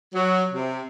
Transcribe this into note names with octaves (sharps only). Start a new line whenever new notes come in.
F#3
C3